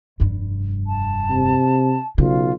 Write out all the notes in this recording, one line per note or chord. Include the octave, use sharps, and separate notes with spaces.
F1 G2
A5
C3
B1 C#3 F4